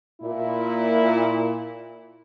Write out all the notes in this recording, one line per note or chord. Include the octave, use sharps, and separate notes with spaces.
A#2 E4